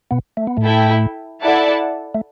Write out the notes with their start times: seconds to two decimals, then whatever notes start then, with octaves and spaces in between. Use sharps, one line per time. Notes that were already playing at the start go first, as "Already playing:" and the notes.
0.11 B2 B3
0.37 A3
0.47 B3
0.57 A2 A3
0.64 E4 A4 E5 G5
1.43 E4 A4 D5 F#5 A5
2.14 A3